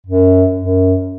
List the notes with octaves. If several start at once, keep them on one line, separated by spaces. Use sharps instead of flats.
F#2
F#2